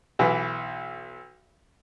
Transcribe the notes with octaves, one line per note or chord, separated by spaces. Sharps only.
B1 E3